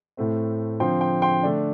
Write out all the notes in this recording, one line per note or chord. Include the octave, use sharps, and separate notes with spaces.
A2 A3 C4
D3 F3 C4 G5 C6
G5 C6
G5 C6
D3 A3 D4